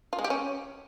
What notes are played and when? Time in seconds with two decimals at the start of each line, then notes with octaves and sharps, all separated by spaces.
0.13 F4
0.19 G#3
0.24 G4
0.30 C#4